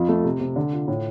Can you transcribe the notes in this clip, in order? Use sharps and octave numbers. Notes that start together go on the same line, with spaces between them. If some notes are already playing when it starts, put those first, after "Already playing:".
Already playing: F2 F4
A3
C3
C3
D3
F4
A2